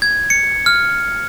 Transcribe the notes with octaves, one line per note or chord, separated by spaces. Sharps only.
G#6
C#7
F6